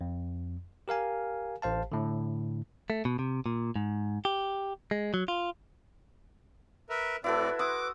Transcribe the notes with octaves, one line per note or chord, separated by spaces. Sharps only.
F2
G4 A#4 F5 G#5
A1 C5 F5 A5
A2 D3
A3
B2
C3
A#2
G#2
G4
G#3
F#3
F4
A#4 B4 E5
A2 C4 E4 F#4 A4 B4 D5
C5 F#5 D6 D#6